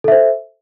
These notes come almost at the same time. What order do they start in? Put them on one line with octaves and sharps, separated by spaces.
A4 E5 C5